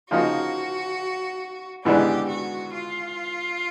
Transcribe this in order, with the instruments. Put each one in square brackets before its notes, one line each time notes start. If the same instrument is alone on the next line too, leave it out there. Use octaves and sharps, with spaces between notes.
[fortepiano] C#3 F3 A#3 D#4 [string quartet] F#4
[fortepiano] G#2 E3 G#3 B3 D4 [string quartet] G4
[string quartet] F#4
F4